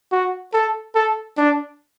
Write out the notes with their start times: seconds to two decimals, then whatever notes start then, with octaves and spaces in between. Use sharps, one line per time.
0.12 F#4
0.54 A4
0.95 A4
1.38 D4